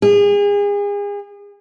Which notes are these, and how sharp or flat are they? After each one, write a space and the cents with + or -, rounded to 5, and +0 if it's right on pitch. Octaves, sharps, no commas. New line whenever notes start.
G#4 -35